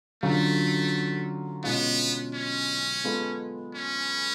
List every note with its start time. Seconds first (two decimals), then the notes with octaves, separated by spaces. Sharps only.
0.23 D3 F#3 A3 C#4 F4
1.64 B2 G#3 B3 C#4 F4
2.34 C#4
3.04 G#3 B3 F4 A4
3.75 C#4